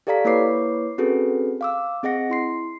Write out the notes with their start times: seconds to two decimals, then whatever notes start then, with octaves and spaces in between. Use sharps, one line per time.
0.07 G4 A4 D5 F5 A#5 B6
0.25 A#3 E4 B4 C#5 D6 C7
0.98 C4 C#4 F#4 G#4 A4 B4
1.61 F5 D6 E6
2.03 C4 G#4 D#5 F#5 A#6 C#7
2.30 E4 C6 C7